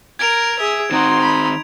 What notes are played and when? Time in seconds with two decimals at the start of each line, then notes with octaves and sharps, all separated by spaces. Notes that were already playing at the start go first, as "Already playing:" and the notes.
0.19 A#4 G#6 D7 F7
0.60 G#4 E5
0.91 D#3 C4 D#4 F#4 C6
1.22 B5